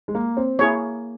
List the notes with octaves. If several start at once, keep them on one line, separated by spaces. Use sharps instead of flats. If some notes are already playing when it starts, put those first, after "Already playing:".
G#3
A#3
C4
A#3 E4 G#4 C#5